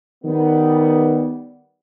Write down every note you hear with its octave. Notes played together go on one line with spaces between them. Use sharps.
D#3 G3 B3